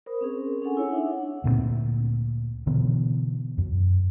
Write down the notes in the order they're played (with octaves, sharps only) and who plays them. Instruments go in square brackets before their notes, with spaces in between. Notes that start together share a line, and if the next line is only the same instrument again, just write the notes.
[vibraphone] A#4 C5 B5 D#6
C4 C#4 G#4
C#4 D4 G#4 A4 F#5 G#5
D#4 E4 C#5
D4 D#4 E5 F#5
[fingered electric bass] D2 A#2 G3 C4
B2 D3 E3 B3
F#2